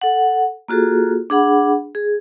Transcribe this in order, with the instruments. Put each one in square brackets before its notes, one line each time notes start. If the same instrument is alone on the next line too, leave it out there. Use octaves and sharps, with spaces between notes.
[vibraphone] A4 F#5
A#3 F4 F#4 G#4 A4
D4 G#4 F#5 B5
G#4